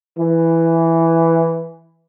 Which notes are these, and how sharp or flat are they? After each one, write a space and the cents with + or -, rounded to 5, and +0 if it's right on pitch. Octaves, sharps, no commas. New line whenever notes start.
E3 +5